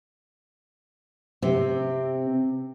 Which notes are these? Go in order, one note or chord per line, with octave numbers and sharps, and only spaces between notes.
C3 C4